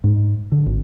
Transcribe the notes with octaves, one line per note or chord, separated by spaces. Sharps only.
G#2
D3
G#1